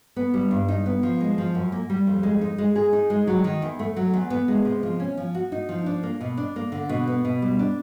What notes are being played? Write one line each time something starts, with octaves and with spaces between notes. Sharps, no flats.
B3
G3
G2
D#4
B3
F3
G#3
F3
F#2
A#3
G3
F2
G#3
D#4
G#3
G#4
D#4
G#3
F#3
D#3
E2
A3
F#3
E2
B3
G#3
C3
F3
C#4
F3
F#4
D#4
F3
D4
A#3
B2
D4
A#3
D3
B2
B3
B2
G3
D4